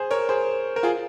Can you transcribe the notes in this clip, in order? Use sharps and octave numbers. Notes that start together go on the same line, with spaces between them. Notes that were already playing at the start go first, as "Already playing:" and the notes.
Already playing: G#4 C5
A#4 C#5
G#4 C5
A#4
F4 G#4